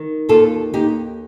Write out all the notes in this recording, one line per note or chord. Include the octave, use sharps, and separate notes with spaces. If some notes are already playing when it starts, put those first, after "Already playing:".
Already playing: D#3
D#2 F4 A4
D#2 D#4 G4